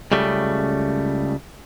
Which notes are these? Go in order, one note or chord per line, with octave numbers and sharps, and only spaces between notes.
C#2 C#3 G3 A3